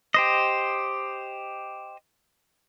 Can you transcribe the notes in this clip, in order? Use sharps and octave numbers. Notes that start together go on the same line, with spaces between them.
G4 C5 D#5